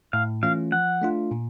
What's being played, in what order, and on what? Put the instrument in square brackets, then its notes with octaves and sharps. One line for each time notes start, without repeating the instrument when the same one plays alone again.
[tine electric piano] A2 [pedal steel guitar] F5
[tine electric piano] E3 A3 C#4 F4 [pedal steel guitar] F5
[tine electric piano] F3 [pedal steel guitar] F#5
[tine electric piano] A3 D4 F4
A#2